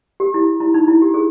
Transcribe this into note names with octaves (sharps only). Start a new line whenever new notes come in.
G4
E4
E4
D#4
E4
G4
G#4